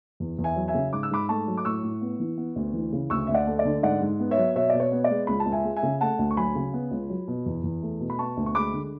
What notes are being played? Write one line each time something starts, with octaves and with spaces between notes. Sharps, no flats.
E2
E2
E5 G#5
F#3
E5 G#5
C#3
G#2 D6
E6
G#2 B5 D6
A3 A5 C#6
F#3
D6
A2 C#6 E6
A2
B3
E3
B3
D2
E3
C#3
D2 C#6 E6
D2 E5
D5 F#5
A3
D5
D3
G#2 D5 F#5
G#2
B3
C#5 E5
F#3
B2 C#5 E5
B2 D5
C#5
B3
D5
G#3
C#2 B5
A5
C#2
E5 G#5
G#3
E5 G#5
C#3
A3 F#5 A5
D2
C#6
F#3 G#5 B5
C#3
B3
C#2
F#3
B2
E2
E2
A3
B2
B5
B3 A5 C#6
D2
C#6
G#3 B5 D6
D3